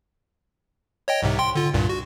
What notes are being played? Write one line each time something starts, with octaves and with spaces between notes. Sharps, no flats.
C#5 D#5 G5
C2 G#2 C3
G5 C6
D3 F4
C2 G2 A#2
F#4